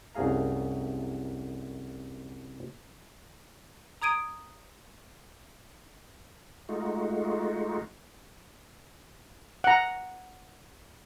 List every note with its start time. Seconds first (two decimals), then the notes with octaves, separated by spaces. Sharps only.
0.15 C2 F#2 A3 G#4 F5 A#5
4.02 A#5 D#6 G#6 D7 D#7
6.69 G#3 A3 D#4 F4 F#4
9.64 F#5 A#5